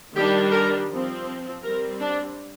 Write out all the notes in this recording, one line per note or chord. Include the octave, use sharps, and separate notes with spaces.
D#3 G3 D4 G4
A#4
F3 C4
G3 C4 A#4
D4